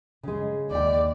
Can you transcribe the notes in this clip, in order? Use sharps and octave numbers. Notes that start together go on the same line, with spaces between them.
C#3 G#3
D#2 D5 G5